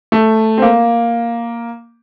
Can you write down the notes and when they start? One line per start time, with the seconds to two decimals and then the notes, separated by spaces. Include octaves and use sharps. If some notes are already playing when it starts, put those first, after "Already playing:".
0.12 A3
0.58 C4
0.62 A#3